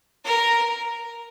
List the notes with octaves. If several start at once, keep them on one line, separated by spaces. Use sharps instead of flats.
A#4